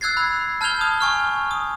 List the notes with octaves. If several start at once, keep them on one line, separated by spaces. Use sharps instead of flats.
E6 F#6 G#6 A6 C7
B5
A5 F6 G6 G#6 F7 G7
D#6
G#5 C#6 F6
D#6